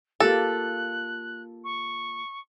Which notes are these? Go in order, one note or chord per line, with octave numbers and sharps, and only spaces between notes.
A#3 F4 G4 A4 F#6
C#6